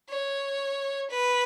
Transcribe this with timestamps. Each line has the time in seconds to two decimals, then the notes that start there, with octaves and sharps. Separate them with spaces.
0.09 C#5
1.10 B4